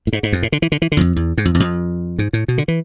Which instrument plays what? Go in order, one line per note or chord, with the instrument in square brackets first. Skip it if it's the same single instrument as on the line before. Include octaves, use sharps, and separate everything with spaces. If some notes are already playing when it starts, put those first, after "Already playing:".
[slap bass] A2
G#2
G#2
F2
A2
D3
E3
D3
E3
D3
E2
F2
E2
G#2
F2
E2
F2
G#2
A2
B2
D3
E3